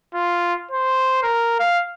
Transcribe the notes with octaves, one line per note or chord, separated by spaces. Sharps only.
F4
C5
A#4
F5